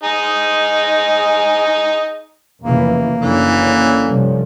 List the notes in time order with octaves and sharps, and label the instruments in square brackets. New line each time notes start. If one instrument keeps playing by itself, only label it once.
[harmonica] D#4 G#4 D#5
[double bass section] F1 C#3 E3 [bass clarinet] A#3
[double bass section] F#1 [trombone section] D3 C#4 [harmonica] E3
[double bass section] G2 C3 F3